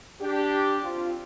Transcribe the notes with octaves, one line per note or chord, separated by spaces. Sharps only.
D4 G4
C4 F4